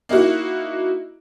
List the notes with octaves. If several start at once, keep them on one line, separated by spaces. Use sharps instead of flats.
A#3 D#4 E4 F#4